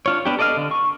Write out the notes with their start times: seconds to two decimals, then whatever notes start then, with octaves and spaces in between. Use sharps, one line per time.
0.06 D4 F4 C#5
0.25 B3 D4 G4
0.39 A4 D5 D#5 F5 F6
0.57 D3
0.71 C#6